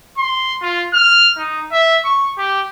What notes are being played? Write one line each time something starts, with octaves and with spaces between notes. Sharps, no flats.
C6
F4
F6
D#4
E5
C#6
G4